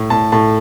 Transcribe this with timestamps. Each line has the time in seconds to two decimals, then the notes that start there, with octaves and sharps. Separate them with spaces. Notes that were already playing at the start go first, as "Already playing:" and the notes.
Already playing: A2
0.10 A2 A5
0.32 A2 A5